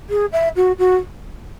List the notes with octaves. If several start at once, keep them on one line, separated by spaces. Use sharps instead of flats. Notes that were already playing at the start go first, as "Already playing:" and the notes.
G#4
E5
F#4
F#4